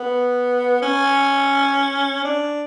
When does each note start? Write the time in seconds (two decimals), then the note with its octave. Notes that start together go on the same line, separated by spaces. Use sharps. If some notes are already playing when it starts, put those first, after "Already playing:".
Already playing: B3
0.82 C#4
2.24 D4